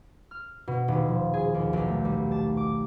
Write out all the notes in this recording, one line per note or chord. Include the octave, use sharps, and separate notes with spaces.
F6
B2
D#1
F3
G#4
D#2
B1
A3
G3
A5
D6